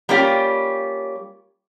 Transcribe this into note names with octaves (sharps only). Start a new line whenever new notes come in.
G3 A#3 C#4 F4 G4